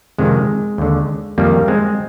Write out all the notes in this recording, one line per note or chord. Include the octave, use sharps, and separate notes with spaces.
F2 C3 D#3 G#3
D#2 D3
F2 D#3 G3 A#3
G#3 C4